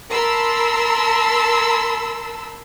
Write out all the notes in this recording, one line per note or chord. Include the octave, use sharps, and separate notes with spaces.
A#4 A5 B5 C6 E6